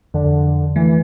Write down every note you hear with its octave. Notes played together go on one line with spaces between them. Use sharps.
F2 D3
E3 A3